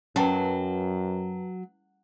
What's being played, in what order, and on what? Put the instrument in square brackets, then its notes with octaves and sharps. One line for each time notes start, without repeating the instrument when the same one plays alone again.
[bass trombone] F#2 [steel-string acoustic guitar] F#3 [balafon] C#4 [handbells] B4 G5 A5